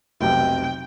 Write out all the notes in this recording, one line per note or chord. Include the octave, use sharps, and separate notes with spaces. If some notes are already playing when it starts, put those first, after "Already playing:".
F1 B1 C3 G5